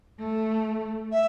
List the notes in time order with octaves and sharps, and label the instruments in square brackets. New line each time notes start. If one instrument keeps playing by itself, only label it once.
[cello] A3
[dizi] E5